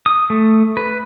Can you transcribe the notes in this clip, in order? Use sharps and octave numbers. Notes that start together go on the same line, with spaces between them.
D#6
A3
B4